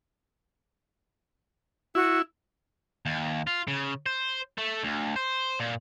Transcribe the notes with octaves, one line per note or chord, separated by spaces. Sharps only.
E4 F#4
D#2
F4
C#3
C5
A3
D2
C5
A#2